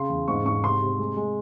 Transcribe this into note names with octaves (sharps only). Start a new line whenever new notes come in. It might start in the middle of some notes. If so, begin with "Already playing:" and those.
Already playing: C#3 C6
E2
G#2 C#6
G#2 C#6
C3 C6
C3
G#3
G#3